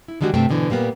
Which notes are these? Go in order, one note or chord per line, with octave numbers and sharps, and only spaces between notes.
E4
D3 D#3 G3 G#3 F#4
G2 C3 A3 G5
G#2 B2 D3 E3
A#2 G3 A#3 B3